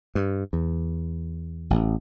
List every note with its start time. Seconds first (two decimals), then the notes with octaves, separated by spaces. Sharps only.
0.15 G2
0.53 E2
1.70 A1